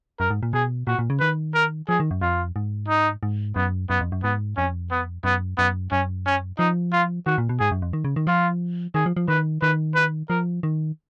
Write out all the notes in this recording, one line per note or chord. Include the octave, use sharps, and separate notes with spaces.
F#2 A#4
G#2
A#2
B2 G#4
A#2 F#4
A#2
C#3
D#3 B4
A#4
F3 G#4
D#3
F#2
F2 F4
G#2
D#4
G#2
F#2 B3
F#2 B3
F2
F#2
G#2 B3
F2 C#4
B3
F#2 B3
F#2 B3
F#2 C#4
C#4
F3 D#4
F4
D#3 F#4
A#2
B2
G#2 G#4
F#2
F2
D#3
C#3
D#3
F3 F4
D#3 G#4
F3
F3
D#3 B4
D#3 B4
B4
F3 A#4
D#3